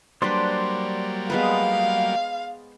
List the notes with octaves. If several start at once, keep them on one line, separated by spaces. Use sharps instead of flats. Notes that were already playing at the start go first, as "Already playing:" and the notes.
F#3 G3 A#3 D4 B4 C5 D5 C6
G#3 B3 B4 F5